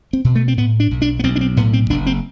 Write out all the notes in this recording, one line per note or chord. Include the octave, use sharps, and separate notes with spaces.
C4
B2
A3
C4
A2 B3
D4
B1
D4
B3
B1 C4
D4
C4
A2 B3
C4
F#1 D4
C4